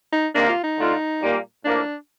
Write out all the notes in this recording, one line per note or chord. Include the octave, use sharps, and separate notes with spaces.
D#4
C3 D#3 A#3 D4
F4
D#4
D3 A3 D4 F4
A#2 G3 A#3
A2 F3 A#3 D4